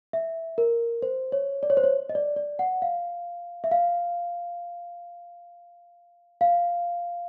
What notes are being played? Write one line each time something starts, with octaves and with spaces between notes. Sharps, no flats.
E5
A#4
C5
C#5
D5
C#5
C5
C#5
D#5
D5
D5
F#5
F5
E5
F5
F5